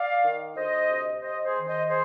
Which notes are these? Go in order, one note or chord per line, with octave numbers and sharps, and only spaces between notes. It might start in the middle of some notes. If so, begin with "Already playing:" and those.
Already playing: D5 F5
D#3
D2 C5 D#5
C3
C4 C5 D#5
G#4 C5
D#3
C5 D#5
G#4 C5